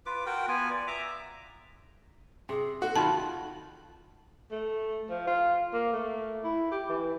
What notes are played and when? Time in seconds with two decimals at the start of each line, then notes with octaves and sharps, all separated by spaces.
0.06 F4 B4 D6
0.26 F#4 A#4 G5
0.48 B3 F4 G#5
0.71 D5
0.87 E5 A#5 D6
2.49 C3 G#4
2.82 F#4 A4
2.96 D#3 F4 A5 B5
4.51 A3
5.10 F3
5.27 F4
5.74 A#3
5.93 A3
6.44 E4
6.72 G4
6.89 E3